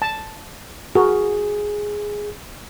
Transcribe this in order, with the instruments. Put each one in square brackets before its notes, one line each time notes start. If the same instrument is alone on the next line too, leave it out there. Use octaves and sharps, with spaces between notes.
[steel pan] A5
[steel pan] F#4 A#4 [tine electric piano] G#4